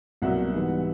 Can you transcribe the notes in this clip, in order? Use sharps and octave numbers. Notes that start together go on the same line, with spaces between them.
C2 B2 F#3 A#3 E5 F#5
G#2 E3 G3 B3